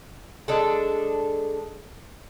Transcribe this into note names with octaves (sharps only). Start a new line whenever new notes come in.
G#3 D4 A4